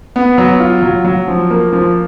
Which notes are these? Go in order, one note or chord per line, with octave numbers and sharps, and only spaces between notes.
B3
F#3
F4
F#3
F#3
F3
A#3
F3